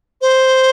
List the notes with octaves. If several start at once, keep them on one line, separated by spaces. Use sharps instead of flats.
C5